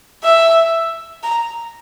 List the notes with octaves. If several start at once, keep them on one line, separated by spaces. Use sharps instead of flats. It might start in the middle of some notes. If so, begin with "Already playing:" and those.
E5
A#5